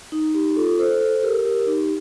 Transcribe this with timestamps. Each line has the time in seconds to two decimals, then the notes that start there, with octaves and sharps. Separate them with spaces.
0.12 D#4
0.35 D#4 G4
0.56 F4 A4
0.79 A4 C5
1.00 A4 C5
1.16 A4
1.23 G4 A#4
1.45 G4 A#4
1.67 D#4 G4